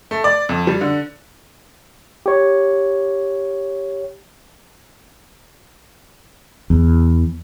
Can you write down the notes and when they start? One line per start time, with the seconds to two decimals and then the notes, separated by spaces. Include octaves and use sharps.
0.11 A3
0.24 D5
0.49 F2
0.67 G3
0.81 D3
2.26 G4 C#5
6.70 E2